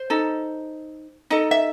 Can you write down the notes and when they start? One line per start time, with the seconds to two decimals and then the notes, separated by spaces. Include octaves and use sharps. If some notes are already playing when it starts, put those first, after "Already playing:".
Already playing: C5
0.10 D#4 A4
1.30 D#4 A4 D#5
1.51 E5